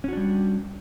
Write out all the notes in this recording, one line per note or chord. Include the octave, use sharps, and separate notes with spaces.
G3 C#4 D4 F#4